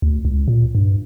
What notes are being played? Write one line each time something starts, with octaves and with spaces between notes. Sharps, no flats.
D2
C#2
A#2
G2